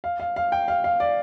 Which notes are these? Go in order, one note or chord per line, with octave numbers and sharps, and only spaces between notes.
F5
F5
F5
G5
F5
F5
D5